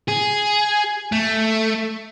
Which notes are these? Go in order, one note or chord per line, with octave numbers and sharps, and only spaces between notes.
G#4
A3